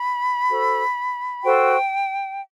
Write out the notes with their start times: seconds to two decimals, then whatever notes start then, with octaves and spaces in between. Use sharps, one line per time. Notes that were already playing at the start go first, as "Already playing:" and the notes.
Already playing: B5
0.49 F#4 A4 C5
1.43 F#4 A4 C5 G5